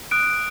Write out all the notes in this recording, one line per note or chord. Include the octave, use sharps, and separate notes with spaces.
D#6 F#6 D7